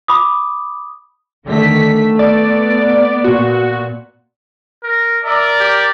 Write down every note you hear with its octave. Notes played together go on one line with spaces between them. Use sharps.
B5 D6 D#6
D3 D#3 A3 B6
B3 D5
A#2 F#4
A#4
A#4 D5 E5
G4